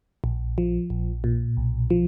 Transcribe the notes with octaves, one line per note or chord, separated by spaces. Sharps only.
A#1
F3
A#1
A#2
B1
F3